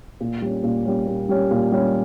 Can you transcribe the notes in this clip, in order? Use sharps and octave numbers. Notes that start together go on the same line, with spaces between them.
A#2
G3 C#4
A#2
G3 C#4
A#2
G3 C#4
A#2
G3 C#4